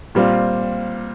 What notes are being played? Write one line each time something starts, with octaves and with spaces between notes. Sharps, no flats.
A#2 G3 C4 F4